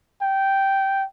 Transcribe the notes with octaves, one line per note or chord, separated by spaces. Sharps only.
G5